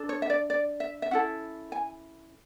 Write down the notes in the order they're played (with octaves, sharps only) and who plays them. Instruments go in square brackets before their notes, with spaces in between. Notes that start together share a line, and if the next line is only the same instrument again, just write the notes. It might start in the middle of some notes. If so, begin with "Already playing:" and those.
Already playing: [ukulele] D4 A4
C#5
E5
D5
D5
E5
E5
C#4 E4 A4 F#5
G#5